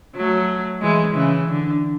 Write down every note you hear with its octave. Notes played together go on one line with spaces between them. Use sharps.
F#3 A3
E3 G#3
C#3 E3
D3